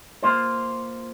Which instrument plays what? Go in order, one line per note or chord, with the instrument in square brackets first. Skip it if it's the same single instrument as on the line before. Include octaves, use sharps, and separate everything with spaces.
[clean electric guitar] A#3 F4 C5